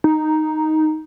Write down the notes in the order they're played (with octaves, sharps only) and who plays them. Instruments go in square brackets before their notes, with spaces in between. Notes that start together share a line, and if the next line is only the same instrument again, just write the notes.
[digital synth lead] D#4